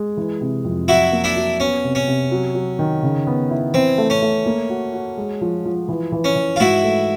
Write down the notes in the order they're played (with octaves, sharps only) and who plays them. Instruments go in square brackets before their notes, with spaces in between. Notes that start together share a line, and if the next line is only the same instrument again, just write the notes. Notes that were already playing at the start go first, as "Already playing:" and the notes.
Already playing: [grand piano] G#3
E3
C3
F2
[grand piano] F#3 [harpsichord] E4 F#4
[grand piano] A#3
[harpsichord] D4 E4
[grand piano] F#3
[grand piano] B3 [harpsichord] C#4
[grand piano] C3
[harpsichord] C#4
[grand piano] C3
F#3
F#3
D#3
C#3
B3
E4
[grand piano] E3 [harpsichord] C4
[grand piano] A3
[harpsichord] C#4
[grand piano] A3
A#3
F#4
F#4
G#3
F3
F3
E3
E3
[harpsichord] C#4
[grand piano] E3
[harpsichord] F4
[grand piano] G#2 [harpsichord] E4 F#4
[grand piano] A3